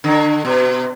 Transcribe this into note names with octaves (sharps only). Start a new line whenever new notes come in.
D3
B2